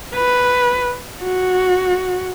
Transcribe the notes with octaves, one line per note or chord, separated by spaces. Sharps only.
B4
F#4